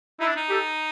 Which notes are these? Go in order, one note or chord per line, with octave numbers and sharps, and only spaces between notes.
D#4 E4
D4
D#4
G4 A4